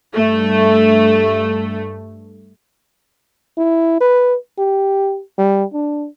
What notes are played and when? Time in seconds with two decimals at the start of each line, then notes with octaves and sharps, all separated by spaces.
0.16 G2 A3
3.57 E4
4.00 B4
4.58 G4
5.38 G3
5.73 D4